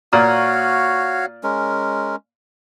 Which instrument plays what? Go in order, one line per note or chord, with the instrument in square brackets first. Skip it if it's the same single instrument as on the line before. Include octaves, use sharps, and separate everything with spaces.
[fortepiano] A#2 [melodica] F#4 C#5 F5
[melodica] G#3 C#4 A#4